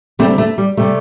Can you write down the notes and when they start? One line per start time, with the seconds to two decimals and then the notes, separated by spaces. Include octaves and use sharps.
0.19 D2 C3 G3 A3 C4
0.38 A3
0.58 G3
0.77 C3 G3 A3